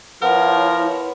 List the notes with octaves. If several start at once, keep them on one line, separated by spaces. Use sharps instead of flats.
F3 B3 E4 A#4 C#5